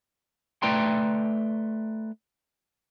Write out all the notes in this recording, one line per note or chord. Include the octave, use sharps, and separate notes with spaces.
A3 B4 D5 G5 A#5 C6